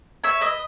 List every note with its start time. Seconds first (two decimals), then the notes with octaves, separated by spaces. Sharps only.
0.24 C#5 E5
0.41 B4 D#5